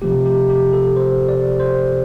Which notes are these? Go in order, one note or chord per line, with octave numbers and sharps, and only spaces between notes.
C3 F3 A3 G4
G4
G4
A4
C5
D5
C5